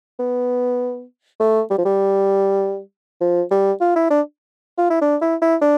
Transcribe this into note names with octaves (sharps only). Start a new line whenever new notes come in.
B3
A3
G3
F3
G3
F3
G3
F4
E4
D4
F4
E4
D4
E4
E4
D4